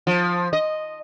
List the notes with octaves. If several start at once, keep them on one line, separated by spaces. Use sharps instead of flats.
F3
D#5